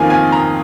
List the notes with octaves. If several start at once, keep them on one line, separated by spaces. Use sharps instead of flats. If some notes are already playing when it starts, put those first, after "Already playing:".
Already playing: F2 D#3 A#3 F4 G#5
G#5
A#5